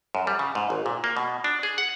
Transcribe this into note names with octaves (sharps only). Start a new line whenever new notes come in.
F#2
G3
C#3
G#2
G#1
A#2
A#3
B2
D4
G#4
F#5